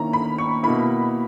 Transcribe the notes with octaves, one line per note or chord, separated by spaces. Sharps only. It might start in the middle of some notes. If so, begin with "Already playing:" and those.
Already playing: D#3 A#3 C#4 E4 A#5
B5
C#6
B2 A#3 E4 B5